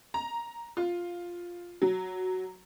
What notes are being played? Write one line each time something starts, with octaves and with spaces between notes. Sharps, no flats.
A#5
F4
F#3